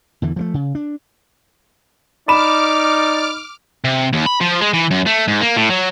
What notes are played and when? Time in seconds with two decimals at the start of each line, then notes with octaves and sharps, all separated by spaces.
0.22 E2 D3 E3
0.36 F3 F#3 A3
0.54 C#3
0.75 D4
2.28 D#4 D5 B5 D6 F6 E7
3.84 C3
4.13 D#2
4.26 B5
4.41 F3
4.61 G#3
4.74 E3
4.91 F#2
5.06 A3
5.28 G#2
5.41 A#3
5.56 A2
5.70 F#3